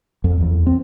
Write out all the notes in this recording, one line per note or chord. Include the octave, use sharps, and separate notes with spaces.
F2
E2
C4